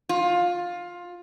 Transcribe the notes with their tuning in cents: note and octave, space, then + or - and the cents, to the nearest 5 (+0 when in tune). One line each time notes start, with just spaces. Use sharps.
F4 +15